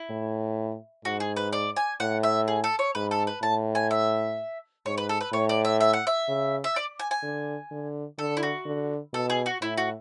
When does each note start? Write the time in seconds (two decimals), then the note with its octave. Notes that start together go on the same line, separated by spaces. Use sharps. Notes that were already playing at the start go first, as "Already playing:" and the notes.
Already playing: E4
0.10 A2
1.05 G#2 F#4
1.20 G#4
1.36 B4
1.53 D5
1.76 G#5
2.00 A2 F#5
2.23 E5
2.48 G#4
2.64 A4
2.79 C#5
2.95 G#2 B4
3.11 A4
3.27 B4
3.43 A2 A5
3.75 G#5
3.91 E5
4.86 G#2 C#5
4.98 B4
5.09 A4
5.21 B4
5.32 A2 C#5
5.49 D5
5.65 E5
5.81 E5
5.93 F#5
6.07 E5
6.28 C#3
6.64 E5
6.76 D5
6.99 G#5
7.11 G#5
7.23 D3
7.71 D3
8.18 D3 A4
8.37 E4
8.43 F#4
8.66 D3
9.13 B2 A4
9.30 G#4
9.46 F#4
9.61 A2 E4
9.77 F#4